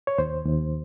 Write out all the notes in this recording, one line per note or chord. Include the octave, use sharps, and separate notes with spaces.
C#5
D#2 C5
D#2